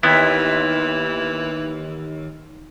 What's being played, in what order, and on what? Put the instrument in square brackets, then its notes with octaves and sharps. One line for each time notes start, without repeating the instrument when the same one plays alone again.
[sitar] D#2 [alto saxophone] E3 [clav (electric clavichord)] B3 E4